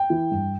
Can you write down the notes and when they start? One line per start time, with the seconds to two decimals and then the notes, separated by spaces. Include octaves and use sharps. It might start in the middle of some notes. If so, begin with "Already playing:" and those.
Already playing: G5
0.10 E3
0.31 G2